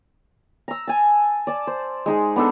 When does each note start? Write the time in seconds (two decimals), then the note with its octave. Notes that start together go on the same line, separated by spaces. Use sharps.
0.68 A#5 E6
0.87 G#5 A5
1.47 D5 A5
1.67 C5
2.06 G#3 D#4 G#4
2.36 B3 D4 D#4 A4